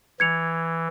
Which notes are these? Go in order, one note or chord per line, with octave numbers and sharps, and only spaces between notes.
E3 G#6 C#7 F7